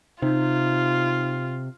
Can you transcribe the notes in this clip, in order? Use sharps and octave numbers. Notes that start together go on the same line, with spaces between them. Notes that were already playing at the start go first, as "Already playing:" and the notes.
C3 D#4 F4